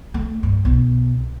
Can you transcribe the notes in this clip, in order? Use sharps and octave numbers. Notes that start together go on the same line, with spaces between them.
A3
G2
B1